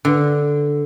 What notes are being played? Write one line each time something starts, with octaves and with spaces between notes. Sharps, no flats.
D3